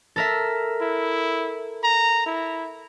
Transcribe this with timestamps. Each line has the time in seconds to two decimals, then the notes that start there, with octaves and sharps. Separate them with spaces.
0.16 A4 A#4 E5
0.81 E4
1.83 A#5
2.26 E4